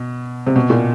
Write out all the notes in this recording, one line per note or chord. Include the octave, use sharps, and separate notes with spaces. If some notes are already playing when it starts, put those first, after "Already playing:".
Already playing: B2
C3
B2
A#2